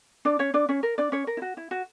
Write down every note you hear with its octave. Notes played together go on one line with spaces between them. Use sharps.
D4 D5
C#4 C#5
D4 D5
C#4 C#5
A#4
D4 D5
C#4 C#5
A#4
E4
F#4
E4
F#4